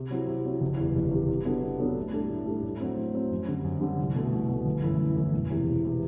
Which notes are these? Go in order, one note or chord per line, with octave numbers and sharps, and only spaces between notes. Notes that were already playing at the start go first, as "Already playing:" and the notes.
Already playing: C3
F#3 C4 E4
C3
F#3 C4 E4
F#1
E2 C3 G3
F#1
E2 C3 G3
C3
F#3 B3 D4 A4
C3
F#3 B3 D4 A4
A2
G3 D4 A4
A2
G3 D4 A4
A2
F#3 C4
A2
F#3 C4
F#2
D3 G3 C4
F#2
D3 G3 C4
C2
B2 A3
C2
B2 A3
G1
F#2 E3 A3 E4
G1
F#2 E3 A3 E4
E1
E2 C3 E3
E1
C3 E3